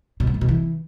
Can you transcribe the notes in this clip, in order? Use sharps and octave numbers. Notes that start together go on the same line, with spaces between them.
B2
F2
G#2
B2
E3